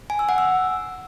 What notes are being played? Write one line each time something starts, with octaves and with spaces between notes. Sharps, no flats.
G#5
E6
F#5
E6